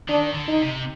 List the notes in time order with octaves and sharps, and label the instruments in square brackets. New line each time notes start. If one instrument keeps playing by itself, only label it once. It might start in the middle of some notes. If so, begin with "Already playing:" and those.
[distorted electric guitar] D#3 [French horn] D4
[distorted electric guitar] D3
[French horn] D#4
[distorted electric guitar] C3